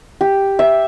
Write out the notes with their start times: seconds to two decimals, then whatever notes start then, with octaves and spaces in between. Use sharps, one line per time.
0.21 G4
0.59 E5